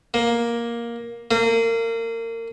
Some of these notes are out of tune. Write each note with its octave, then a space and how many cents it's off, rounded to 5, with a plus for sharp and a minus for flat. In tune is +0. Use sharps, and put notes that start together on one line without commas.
A#3 +10
A#3 -30